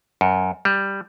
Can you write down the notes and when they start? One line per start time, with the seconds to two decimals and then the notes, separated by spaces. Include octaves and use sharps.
0.21 F#2
0.65 G3